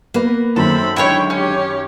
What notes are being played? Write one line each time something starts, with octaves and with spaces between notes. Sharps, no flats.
A#3 B3 B4
F#2 D#3 C4 A4 B5
D3 G#3 E4 C#5 G5
C#4 G4 C#5